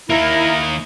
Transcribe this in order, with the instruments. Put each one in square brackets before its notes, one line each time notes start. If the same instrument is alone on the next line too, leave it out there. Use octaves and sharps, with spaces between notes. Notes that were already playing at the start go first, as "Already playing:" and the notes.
[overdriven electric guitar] D#3 A#3 [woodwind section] E4 A#4